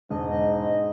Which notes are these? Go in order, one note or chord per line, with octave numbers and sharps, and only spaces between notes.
E1 G#2 D#5